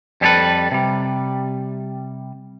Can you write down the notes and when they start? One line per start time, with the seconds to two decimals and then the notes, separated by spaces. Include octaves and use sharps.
0.21 F2 G3 C#4 G4 A4 B4
0.71 C3 G3